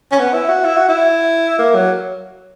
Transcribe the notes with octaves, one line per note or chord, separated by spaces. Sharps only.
C#4
B3
E4
F#4
E4
F#4
E4
A#3
F#3